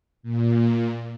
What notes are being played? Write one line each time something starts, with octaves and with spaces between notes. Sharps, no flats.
A#2